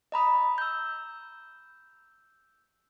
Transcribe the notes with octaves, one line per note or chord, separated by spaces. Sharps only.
D#5 A#5 B5 D#6
E6 G6